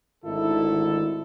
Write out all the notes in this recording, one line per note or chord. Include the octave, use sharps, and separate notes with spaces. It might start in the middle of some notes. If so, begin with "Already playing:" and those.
G#1 D3 D#3 A3 E4 A4